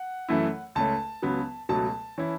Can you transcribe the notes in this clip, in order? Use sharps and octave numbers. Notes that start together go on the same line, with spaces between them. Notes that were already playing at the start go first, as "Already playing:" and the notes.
Already playing: F#5
F#2 E3 A3 E4
C#2 C#3 A3 C#4 A5
C#2 C#3 F#3 B3
C#2 B2 F#3 A3 A5
E3 C#4 E4